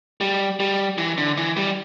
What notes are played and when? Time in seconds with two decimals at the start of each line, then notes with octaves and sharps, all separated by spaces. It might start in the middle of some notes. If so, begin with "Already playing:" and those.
0.21 G3
0.60 G3
0.98 E3
1.18 D3
1.37 E3
1.57 G3